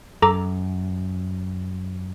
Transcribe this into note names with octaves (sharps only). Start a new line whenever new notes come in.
F#2 A4 A#5 D6